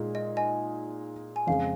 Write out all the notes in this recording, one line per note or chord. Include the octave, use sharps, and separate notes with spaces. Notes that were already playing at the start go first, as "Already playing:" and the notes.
Already playing: A#2 G#3 D#4
D#5
D#5 G#5
G#5
F2 C#3 G#3 F5